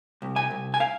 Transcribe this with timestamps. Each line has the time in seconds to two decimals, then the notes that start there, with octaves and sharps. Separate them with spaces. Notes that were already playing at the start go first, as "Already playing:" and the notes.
0.22 C2
0.36 G#5
0.51 C2
0.74 G#5
0.80 F5